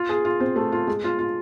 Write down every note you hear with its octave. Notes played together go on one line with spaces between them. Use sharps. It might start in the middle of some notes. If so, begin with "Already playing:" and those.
Already playing: F4
G#4
F4
C4
A3
F4
G#3
F4
F4